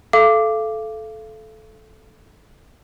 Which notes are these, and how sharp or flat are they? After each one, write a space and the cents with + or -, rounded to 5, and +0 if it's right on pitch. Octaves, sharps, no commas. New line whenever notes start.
A4 -15 F5 -30 D6 +0